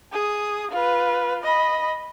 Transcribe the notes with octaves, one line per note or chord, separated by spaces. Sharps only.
G#4 D#6
F4 B4
D#5 B5